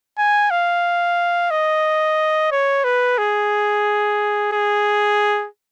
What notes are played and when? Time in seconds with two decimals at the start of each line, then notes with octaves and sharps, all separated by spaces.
0.18 G#5
0.51 F5
1.51 D#5
2.52 C#5
2.84 B4
3.18 G#4
4.52 G#4